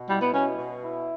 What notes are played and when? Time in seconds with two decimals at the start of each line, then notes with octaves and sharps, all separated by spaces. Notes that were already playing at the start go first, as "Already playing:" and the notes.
Already playing: B2
0.09 G3 E4
0.21 B3
0.33 B2 C#4
0.58 B2
0.84 E4